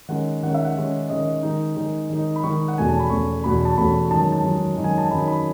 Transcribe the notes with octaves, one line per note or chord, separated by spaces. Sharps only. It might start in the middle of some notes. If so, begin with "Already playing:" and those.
D#3 G#3 C#4 F#5
D#3 G#3 C#4 F#5
E5
F#5
D#3 G#3 C#4
D#3 G#3 C#4 D#5
D#3 G#3 D#4
D#3 G#3 D#4
D#3 G#3 D#4
B5
D#3 G#3 D#4 C#6
F#5
E2 B2 A3 C#4 G#5
A5
B5
E2 B2 A3 C#4 C#6
E2 B2 A3 C#4 B5
A5
E2 B2 A3 C#4 B5
F#2 D#3 G#3 D#4 A5
A5
F#2 D#3 G#3 D#4
F#2 D#3 G#3 D#4
G#5
A5
F#2 D#3 G#3 D#4 B5
B5